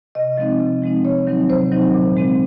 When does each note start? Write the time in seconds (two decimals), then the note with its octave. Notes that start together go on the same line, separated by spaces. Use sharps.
0.15 C3 D#5
0.38 F3 G#3 C4 D#4
0.60 C3
0.82 F3 G#3 C4 D#4
1.05 C3 C#5
1.27 D#3 F#3 C4 D#4
1.50 C3 C5
1.72 D#3 F#3 C4 D#4
1.94 A#2
2.17 G#3 C4